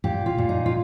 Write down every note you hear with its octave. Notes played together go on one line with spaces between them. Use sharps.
A#2 G4
F4
A#2
D#4
F4